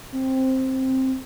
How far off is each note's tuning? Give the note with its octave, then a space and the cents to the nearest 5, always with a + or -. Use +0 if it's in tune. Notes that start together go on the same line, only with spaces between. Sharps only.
C4 +5